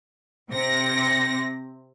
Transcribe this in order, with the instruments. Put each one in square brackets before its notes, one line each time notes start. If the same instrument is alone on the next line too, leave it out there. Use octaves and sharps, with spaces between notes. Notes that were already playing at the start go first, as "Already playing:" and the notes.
[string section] C3 C4 A#6